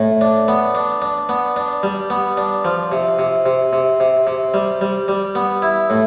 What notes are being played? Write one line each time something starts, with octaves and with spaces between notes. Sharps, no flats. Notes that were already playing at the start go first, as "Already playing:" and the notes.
Already playing: A2
D4
B3
D4
D4
B3
D4
G3
B3
D4
F3
C3
C3
C3
C3
C3
C3
G3
G3
G3
B3
E4
A2